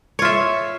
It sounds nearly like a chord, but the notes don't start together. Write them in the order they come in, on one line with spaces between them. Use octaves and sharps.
C#5 F4 E5